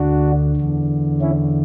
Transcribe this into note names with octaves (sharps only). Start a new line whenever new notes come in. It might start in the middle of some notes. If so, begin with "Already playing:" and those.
Already playing: D2 D3 D4 F#4
E2 D3
C#4 E4